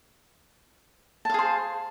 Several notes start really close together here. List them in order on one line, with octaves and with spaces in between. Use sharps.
A5 F5 G#4 C5